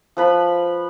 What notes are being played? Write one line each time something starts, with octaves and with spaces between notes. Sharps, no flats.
F3 B4 B5